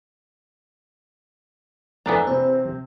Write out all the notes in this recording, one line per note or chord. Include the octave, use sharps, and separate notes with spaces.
F2 E3 A3 B3 D4 A5 A#5
C3 C4 C5